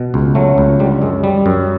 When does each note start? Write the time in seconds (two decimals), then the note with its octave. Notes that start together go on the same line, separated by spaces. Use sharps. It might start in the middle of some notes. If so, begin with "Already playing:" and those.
Already playing: B2
0.14 C#2
0.35 F#3 A3
0.58 C#2
0.79 D3 G3
1.02 F#2 G#3
1.24 G3
1.46 F#2